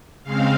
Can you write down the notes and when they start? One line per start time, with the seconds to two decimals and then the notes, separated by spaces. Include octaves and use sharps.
0.24 C#3 G#3 C4 F5